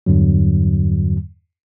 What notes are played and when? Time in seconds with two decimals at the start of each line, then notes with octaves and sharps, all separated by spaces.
0.06 E2 G2 D3 F#3